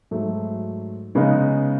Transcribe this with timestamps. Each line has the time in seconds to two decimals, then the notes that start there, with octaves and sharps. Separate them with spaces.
0.11 G#2 F#3 A3
1.15 C#3 G#3 B3 D#4